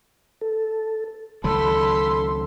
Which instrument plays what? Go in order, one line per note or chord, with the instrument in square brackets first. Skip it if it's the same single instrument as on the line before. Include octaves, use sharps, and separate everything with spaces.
[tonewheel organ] A4
[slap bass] C#2 D#3 F#3 [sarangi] A4 [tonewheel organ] B5 [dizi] C6